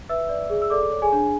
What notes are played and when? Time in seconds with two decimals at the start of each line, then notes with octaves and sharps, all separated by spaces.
0.09 B4 E5 E6
0.29 D5
0.50 G#4
0.62 E6
0.70 A4 D5 D6
0.92 C#5
1.02 G#4 G#5
1.12 D4